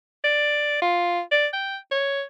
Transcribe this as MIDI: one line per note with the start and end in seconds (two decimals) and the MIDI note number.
0.24 0.79 74
0.82 1.21 65
1.31 1.47 74
1.53 1.77 79
1.91 2.23 73